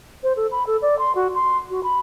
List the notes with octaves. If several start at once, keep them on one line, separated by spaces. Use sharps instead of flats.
C5
A4
B5
A4
D5
C6
F#4
C6
F#4
B5